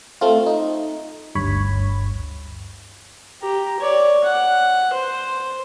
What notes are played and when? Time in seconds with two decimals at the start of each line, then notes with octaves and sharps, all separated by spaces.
0.21 A3 C4 F4
0.46 D#4
1.35 G1 D2 G2 C#5 B5
3.42 G4 A#5
3.80 C#5 D5
4.24 F#5
4.93 C5